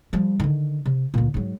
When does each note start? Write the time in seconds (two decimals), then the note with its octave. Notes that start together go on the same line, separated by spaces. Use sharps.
0.13 F3 G3
0.40 D3 D#3
0.86 C3
1.14 D2 A#2
1.34 G#2 F#3